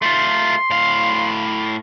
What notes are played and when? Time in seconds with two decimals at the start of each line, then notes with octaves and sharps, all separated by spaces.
0.02 A3 F4 C6
0.71 A2 F5